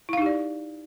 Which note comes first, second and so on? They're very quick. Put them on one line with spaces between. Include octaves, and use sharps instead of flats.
E4 F5 D#4 G4 D5